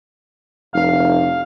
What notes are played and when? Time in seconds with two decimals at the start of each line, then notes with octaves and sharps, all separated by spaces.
0.73 F1 F5